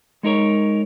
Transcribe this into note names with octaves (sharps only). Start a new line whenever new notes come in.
G#3 D#4 A#4 C#5